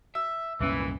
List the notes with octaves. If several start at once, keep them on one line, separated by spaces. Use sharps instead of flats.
E5 E6
C2 F#2 A#2 E3 C#4